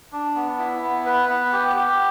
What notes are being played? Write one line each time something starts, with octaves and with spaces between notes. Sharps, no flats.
D4
B3
E4
B3
B4
B3
G4
G4